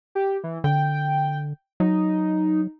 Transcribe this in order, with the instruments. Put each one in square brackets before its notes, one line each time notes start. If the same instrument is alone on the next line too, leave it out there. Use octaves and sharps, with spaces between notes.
[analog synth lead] G4
E3
[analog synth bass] D3 [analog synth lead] G5
[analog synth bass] F#3 [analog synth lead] D#4